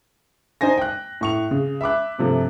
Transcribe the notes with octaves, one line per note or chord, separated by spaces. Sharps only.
D#4 C5 G#5 A#6
G5 F#6
A2 C#6 F7
C#3
E5 B5 D6 F#6
G2 C3 F3 A3